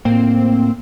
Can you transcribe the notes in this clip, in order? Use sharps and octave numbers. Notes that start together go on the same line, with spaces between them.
A2 A#3 C4